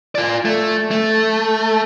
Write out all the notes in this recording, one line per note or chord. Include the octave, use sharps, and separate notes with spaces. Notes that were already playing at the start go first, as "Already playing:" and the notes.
F4 D5
A3
A3